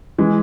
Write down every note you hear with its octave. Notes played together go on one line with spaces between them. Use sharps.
E3 G#3